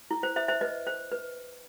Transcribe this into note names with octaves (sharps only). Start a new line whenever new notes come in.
E4
C5
C5 E5
C5 E5
B4 D#5
C5
B4